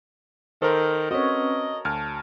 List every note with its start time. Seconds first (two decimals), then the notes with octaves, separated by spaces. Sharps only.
0.62 D#3 A4 A#4 C5
1.11 C4 C#4 F#4 B4 C#5 D#5
1.85 D2 A5 F6